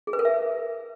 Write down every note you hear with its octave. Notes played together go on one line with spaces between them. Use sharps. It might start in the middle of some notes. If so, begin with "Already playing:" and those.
G#4
B4
A#4
E5